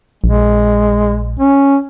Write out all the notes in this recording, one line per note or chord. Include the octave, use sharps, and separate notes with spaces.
A#1 G#3
C#4